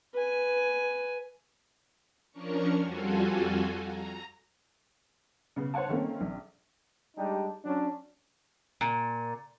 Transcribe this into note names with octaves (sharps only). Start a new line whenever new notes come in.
B4 G#5
F3 C#4 D4 A#4 C#6 C#7
F2 G3 F4 F#4 A4 G#5
A#5
C#3 B3
C5 C#5 F#5 G#5 A5
D#3 A3 A#3 C4 C#4
A#1
G3 G#3 D4 D#4 G4
F#3 C#4 D4
A#2